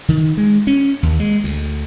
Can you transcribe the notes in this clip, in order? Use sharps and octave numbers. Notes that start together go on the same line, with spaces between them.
D#3
G#3
C#4
D#2
G#3
D2